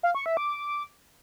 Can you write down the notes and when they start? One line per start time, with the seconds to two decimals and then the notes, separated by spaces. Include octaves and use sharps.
0.03 F5
0.15 C#6
0.26 E5
0.37 D6